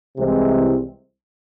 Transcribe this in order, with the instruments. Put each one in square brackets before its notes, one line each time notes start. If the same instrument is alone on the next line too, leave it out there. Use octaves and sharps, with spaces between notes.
[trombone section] C2 C3 E3 G#3 C4